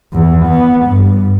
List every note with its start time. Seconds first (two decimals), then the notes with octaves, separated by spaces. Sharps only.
0.13 E2
0.46 B3
0.86 G2